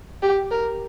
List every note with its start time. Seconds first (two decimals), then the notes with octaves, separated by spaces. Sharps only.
0.22 G4
0.51 A#4